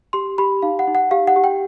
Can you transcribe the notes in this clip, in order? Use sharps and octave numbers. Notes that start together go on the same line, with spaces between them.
G4 C6
G4 B5
D#4 F5
F#5
D#4
F#5
G4 F5
F#5
G4
G5